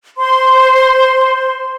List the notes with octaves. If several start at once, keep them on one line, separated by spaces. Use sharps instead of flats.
C5 C6